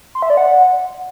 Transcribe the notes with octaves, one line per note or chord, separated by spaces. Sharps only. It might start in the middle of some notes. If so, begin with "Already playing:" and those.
C6
E5
D5
F#5